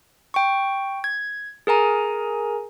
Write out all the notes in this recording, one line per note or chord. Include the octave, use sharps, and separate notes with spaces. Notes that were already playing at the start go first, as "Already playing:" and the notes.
G5 C#6
G#6
G#4 A#4 G#5 A#5